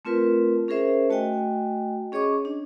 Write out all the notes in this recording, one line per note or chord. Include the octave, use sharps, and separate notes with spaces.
A3 C4 F4 A#4 B4
C#4 G#4 A#4 C5 E5
A3 F#4 D#5 G5 G#5
C#4 G#4 C#5 D#5 C#6 D6
D4